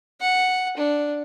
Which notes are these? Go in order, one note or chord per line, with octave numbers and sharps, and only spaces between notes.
F#5
D4